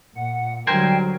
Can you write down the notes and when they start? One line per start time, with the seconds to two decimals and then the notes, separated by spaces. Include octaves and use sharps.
0.16 A#2 F#5
0.67 D3 F#3 G3 A#4 C5 G5 G#5